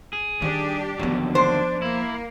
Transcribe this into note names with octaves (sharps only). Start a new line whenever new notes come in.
G#4
D#3 G3 D4 G4
D#2 D3 F3 F#3 B3
D4 C5
A#3 E4